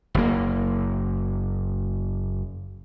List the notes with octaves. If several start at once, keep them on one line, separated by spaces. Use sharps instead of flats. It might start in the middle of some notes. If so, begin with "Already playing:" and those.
F#1 A#3